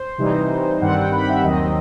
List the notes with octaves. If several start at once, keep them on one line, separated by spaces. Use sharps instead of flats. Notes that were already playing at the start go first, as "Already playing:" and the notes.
Already playing: C5
C3 E3 G3 D#4
G2 D#3 G3 C4 F#5
G5
B5
E5
D#2 D#3 F#3 C4 D#5